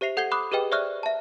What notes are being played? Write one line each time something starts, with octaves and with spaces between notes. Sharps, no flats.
G4 C5 E5 C7 F7
A4 F#5 G6 G#6 C7 G7
B5 D6 D#6 F#6
G4 G#4 B4 D#5 G5
C5 D5 E5 C#6 F6 F#6
E5 A5